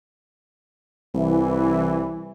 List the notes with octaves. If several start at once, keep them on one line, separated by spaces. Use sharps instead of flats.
C2 E3